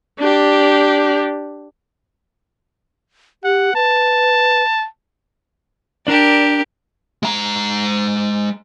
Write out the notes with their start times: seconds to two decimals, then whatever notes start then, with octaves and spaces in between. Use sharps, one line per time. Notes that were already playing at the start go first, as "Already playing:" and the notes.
0.19 D4 G4
3.44 G4 F#5
3.75 B4 A5
6.07 D4 G4 A#4 D5
7.23 G#3 A#5